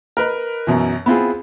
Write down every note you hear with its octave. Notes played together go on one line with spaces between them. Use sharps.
A#4 B4 D#5
F#2 B2 E3
B3 C4 E4 F4 G#4